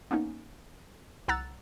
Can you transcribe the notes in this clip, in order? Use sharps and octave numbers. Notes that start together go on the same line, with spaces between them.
A#3 B3 C#4 D#4
C2 F#5 A#5 E6 F#6 A6